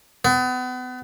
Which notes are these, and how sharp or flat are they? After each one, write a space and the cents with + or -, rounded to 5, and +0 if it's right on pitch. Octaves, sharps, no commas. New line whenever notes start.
B3 +35